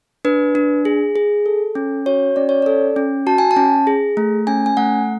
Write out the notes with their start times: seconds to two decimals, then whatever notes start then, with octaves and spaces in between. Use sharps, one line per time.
0.25 D4 B4
0.55 D4
0.85 G#4
1.16 G#4
1.46 A4
1.75 C#4
2.06 F#4 C#5
2.36 C#4 D5
2.49 C#5
2.62 A4 D5
2.96 C#4
3.27 F#4 A5
3.38 G#5
3.51 A5
3.57 C#4
3.87 G#4
4.17 A3
4.47 C#4 G#5
4.66 G#5
4.77 A3 F#5